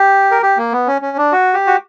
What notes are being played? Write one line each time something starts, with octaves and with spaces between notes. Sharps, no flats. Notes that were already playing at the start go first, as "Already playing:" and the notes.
Already playing: G4
A#4
G4
A#3
B3
C#4
C#4
D4
F#4
G4
F#4